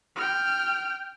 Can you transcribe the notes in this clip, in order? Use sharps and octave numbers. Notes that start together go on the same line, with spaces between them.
G5 F6